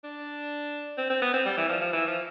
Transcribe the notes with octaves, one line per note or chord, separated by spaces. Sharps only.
D4
C4
C4
B3
C4
G3
E3
F3
F3
E3
F3